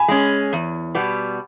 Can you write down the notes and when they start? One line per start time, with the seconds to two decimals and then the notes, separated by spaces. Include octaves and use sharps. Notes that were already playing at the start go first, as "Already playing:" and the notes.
Already playing: G#5 B5
0.08 G#3 C#4
0.53 E2
0.95 B2 G3 B3